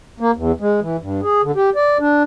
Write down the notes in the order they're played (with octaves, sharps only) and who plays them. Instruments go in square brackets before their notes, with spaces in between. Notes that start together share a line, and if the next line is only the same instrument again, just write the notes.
[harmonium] A#3
E2
G#3
E3
G2
G#4
D3
G4
D5
D4